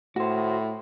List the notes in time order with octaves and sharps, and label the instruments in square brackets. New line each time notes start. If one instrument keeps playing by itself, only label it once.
[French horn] A2 [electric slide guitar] F#4 C5